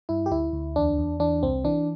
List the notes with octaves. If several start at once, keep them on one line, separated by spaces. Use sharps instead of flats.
G2 E4
G4
D2 E4
D2
E2 D4
E2
E3 D4
C2 C4
E3 D4